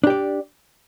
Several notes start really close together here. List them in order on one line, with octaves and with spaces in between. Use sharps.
D4 G4 D5